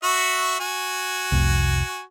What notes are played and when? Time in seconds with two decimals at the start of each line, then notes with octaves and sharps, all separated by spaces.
0.03 F#4 E5 C#6
0.60 F#4 G#5
1.32 F1 C2